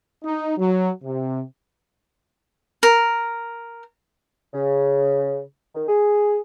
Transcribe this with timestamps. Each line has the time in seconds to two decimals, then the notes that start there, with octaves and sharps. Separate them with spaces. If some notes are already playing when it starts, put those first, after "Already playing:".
0.24 D#4
0.58 F#3
1.04 C3
2.83 A#4
4.54 C#3
5.75 D#3
5.89 G#4